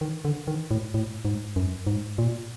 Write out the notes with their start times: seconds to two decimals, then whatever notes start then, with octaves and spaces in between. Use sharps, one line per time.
0.01 D#3
0.25 D3
0.47 D#3
0.71 A2
0.94 A2
1.25 G#2
1.56 F#2
1.87 G#2
2.18 A#2